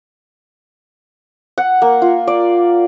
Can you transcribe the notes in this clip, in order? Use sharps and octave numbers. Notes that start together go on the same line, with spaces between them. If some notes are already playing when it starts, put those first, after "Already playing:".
F#5
A#3
F4
D5